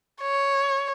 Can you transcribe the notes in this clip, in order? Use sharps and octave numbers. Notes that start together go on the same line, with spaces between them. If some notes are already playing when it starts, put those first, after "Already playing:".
C#5